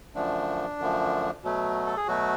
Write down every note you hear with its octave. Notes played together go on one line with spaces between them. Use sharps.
F#2 D3 F3 A3 D4
F#2 D3 F3 A3
B2 F#3 A3
A4
G#4
B2 F#3 A3 F#4